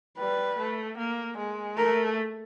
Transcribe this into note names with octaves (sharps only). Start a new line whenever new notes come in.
G3 B4
A3
A#3
G#3
A3 A#4